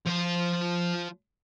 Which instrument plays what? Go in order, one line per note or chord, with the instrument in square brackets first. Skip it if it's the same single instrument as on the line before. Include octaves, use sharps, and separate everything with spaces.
[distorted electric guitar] F3 C5